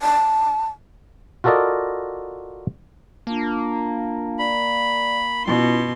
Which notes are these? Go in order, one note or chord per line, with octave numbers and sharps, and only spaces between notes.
A5
F4 F#4 A4 A#4 D5 D#5
A#3 D4 F4 A5
D5 B5
B2 C#4 E4 F4 C6